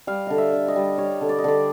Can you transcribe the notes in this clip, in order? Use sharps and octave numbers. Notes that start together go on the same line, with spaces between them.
G3 F5
D3 D#5
E5
D3
D#5
G3
G3 C#5
D3
D5
D#5
D3 D5